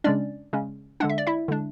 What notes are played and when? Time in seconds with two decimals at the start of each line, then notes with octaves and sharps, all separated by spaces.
0.04 C#3 G#3 C#4 D4 D5
0.53 C#3 G#3 C#4
1.00 D3 G#3 D4 F#5
1.09 E5
1.18 D5
1.27 E4 E5
1.48 D3 G#3 D4